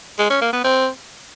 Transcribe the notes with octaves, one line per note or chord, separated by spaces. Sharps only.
G#3
C#4
A#3
B3
C4